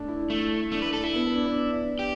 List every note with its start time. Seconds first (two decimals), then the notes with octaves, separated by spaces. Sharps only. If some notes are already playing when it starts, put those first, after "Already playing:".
Already playing: A3 D4
0.08 E4
0.29 A3 E4
0.72 A3 D4
0.82 B4
0.93 A4
1.04 E4
1.14 B3
1.25 B3
1.35 D4
1.46 D4
1.99 G4